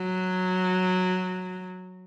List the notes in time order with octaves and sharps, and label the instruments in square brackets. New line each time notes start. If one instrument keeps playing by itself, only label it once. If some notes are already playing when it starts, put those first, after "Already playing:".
Already playing: [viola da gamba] F#3